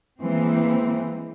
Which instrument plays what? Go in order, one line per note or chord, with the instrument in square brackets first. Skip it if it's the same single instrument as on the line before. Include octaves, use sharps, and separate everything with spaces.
[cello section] E3 G#3 A#3 C4